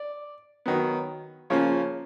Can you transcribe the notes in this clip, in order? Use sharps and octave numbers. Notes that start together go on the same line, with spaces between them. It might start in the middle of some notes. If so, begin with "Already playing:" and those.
Already playing: D5
D#3 F#3 B3
C#3 F3 A#3 C#4 C#5